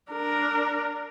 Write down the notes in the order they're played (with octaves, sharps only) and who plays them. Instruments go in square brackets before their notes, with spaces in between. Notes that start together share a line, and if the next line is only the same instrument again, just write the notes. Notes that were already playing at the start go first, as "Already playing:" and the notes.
[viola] D4 A#4